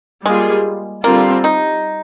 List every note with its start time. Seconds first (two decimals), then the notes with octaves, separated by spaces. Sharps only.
0.25 G3 G#3 A#3 F4 G#4
1.04 D3 G3 A#3 C4 F4
1.44 D#4